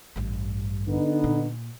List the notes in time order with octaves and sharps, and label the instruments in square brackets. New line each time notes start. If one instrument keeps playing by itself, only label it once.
[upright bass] A1 G2
[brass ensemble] D3 B3 D#4
[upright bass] A#2